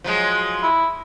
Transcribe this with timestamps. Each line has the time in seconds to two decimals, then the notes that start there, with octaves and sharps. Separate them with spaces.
0.04 F3 F#3 G#3
0.63 E4